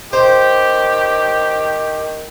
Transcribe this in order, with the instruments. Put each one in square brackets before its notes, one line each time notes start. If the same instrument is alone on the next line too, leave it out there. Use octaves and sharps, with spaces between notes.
[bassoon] D#3 [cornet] G4 [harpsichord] C5